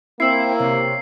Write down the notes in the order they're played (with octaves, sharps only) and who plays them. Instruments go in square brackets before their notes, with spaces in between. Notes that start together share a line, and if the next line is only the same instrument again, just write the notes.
[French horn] A#3 [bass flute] C4 [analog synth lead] E4 [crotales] E6 C7
[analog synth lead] C3 [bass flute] C#5